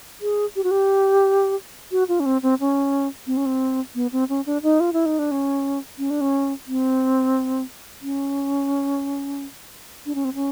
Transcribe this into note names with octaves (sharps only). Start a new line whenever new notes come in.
G#4
G4
F#4
G4
F#4
F4
C#4
C4
C4
C#4
C4
C#4
C4
B3
C4
C#4
D4
D#4
F4
E4
D#4
D4
C#4
C#4
D4
C#4
C4
C#4
D4
C#4
C4
C#4